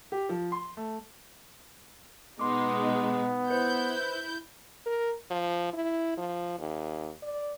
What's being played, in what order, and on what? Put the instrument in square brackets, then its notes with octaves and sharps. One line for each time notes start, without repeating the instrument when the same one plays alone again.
[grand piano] G4
F3
C6
A3
[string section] B2 G#3 D#4 [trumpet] B3 [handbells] C6 D6
[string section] E4 G6 [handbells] B4 C5
[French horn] A#4
F3
E4
F3
D#2
D5